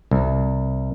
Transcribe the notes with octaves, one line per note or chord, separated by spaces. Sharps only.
C2